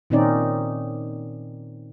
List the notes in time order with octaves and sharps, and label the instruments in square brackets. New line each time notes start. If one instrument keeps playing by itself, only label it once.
[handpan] A#2 D#3 C4 C#4 D#4 D5